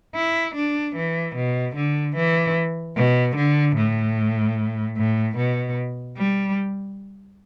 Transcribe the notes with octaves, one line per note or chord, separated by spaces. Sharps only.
E4
D4
E3
B2
D3
E3
B2
D3
A2
A2
B2
G3